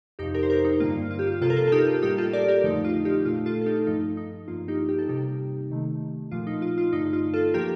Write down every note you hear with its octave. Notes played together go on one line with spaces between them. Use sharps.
F2 C3 F3 D#4 G4
G4 A#4
C5
G4 A#4
D#4
G2 D3 G3 A#3 F4
F4
G4
F4
C3 F3 A#3 F4 A4
A#4
F4 A4
A4
D#4 G4
F4
A2 G3 A#3 D#4 G4
F4 A4
A#4 D5
G4 A#4
F2 D3 F3 A3 D#4
F4
D#4 G4
A#2 A3 F4
F4 A4
A4
D#4 G4
G2 F3 A3 D#4
D#4
G2 F3 A#3 F4
D#4 G4
G4
A4
C3 G3 A#3 D#4 G4
C3 D#3 A3
A#2 F3 A3 F4
D#4
F4
F4
G2 D3 A3 D#4
F4
F4 A4
A2 F3 A#3 G4 A#4